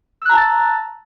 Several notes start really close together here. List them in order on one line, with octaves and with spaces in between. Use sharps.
E6 F#6 A#5 A5 A6